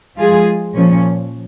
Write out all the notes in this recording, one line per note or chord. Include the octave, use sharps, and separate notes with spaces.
F3 G#3 F4 G#4
A#2 F3 C#4